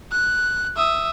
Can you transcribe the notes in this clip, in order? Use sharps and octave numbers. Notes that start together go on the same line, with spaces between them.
F#6
E5 D#6